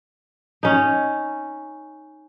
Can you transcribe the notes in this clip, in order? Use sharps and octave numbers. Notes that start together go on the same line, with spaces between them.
C#4 D#4